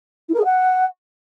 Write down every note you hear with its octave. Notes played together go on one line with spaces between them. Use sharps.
E4
A#4
G#4
F#5